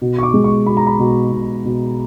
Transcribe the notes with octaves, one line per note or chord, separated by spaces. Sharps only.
B2
C#6
D6
G#3
C#6
B2 B5
A#5
B5
B2
B2
B2